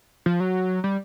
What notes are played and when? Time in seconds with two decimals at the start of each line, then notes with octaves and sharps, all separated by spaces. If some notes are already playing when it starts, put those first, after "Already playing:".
0.26 F3
0.40 F#3
0.84 G3